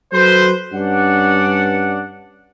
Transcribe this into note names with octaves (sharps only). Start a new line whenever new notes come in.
F#3 A4 B4 C5
G2 C#4 D4 D5 F#5